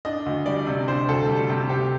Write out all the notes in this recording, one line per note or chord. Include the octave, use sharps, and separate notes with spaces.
D4 D#5
D2
G3 D5
C3
D4 C5
D2 A4
G3
C3 G4
C4 G4